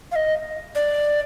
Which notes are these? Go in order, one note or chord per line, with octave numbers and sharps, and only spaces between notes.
F5
D#5
D5